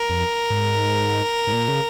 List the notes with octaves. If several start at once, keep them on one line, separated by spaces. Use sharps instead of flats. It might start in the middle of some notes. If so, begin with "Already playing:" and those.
Already playing: A#4
F2
G#2
G#2
A#2
C#3